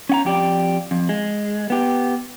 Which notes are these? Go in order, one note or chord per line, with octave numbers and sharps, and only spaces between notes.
C#4 F#5 A#5
F2 G4 D5
F2
G#3
B3 G4